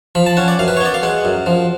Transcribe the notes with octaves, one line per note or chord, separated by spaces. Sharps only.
F3 B5
A5
C#4 F#5
D5
F#2 F5
B4
C#5
B3 D5
F5
G#3 F#5
F#2
F3